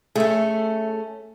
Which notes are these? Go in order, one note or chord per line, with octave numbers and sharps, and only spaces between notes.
A3 C#4 G#4 E5